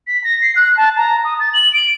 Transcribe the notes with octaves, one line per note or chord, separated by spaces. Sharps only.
B6
A#6
C7
F#6
A5
A#5
D#6
A6
F#7
D7